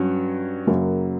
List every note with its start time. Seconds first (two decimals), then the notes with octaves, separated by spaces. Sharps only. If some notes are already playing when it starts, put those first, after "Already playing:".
Already playing: G2 F#3 C#4
0.67 F#2 C#3 F#3 A#3